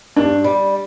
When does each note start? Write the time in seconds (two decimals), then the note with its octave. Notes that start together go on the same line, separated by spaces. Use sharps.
0.16 G2 D4
0.44 G3